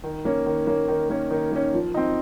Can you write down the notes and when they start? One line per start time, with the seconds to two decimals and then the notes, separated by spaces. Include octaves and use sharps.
0.04 D#3
0.25 A#3 C#4
0.46 D#3
0.67 A#3 C#4
0.88 D#3
1.09 A#3 C#4
1.31 D#3
1.52 A#3 C#4
1.73 F3
1.94 C4 D#4